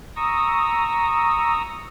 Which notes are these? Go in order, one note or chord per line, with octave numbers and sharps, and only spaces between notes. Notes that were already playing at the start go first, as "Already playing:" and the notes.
A#5 C#6 D#6 E6